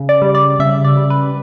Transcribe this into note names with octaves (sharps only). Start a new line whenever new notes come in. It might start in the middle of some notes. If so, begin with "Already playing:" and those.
Already playing: C#3
D5
G3
D5
C#3 E5
D5
G3
B4